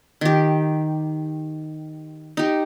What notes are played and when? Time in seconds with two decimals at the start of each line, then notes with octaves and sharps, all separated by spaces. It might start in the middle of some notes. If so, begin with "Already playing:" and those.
0.21 D#3 G4
2.37 D#4 G4